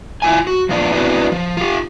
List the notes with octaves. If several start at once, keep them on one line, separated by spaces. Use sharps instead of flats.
E4 F4 G#5
F#4
F3 A#3 B3 D4 F4
B3 C4 D4 E4 F#4 B4
F3
F4 G4